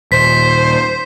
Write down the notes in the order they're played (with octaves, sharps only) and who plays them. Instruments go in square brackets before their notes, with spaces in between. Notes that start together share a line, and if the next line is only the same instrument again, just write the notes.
[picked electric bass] D#1 [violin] C5 [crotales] B6